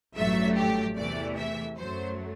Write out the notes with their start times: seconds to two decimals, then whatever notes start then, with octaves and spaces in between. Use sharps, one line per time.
0.15 A1 G2 F#3 A3 E5
0.56 G4
0.96 E2 C3 E3 A3 D5
1.37 E5
1.77 F#2 F#3 A3 C5